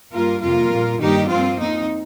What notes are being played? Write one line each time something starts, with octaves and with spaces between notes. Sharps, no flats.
G2 G3 A#3 F4 A#4
F2 C3 G3 A#3 F4 A#4
A#2 A#3
G2 D#3 A#3 D#4 G4
G2 F3 A#3 C4 F4
F2 F3 C4 D#4